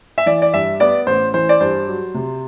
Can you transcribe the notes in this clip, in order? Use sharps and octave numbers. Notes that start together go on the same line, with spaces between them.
E5
E3 D5
D5
G2 E5
B3 D5
A1 C5
E3 C5
D5
G2 C5
F#3
C3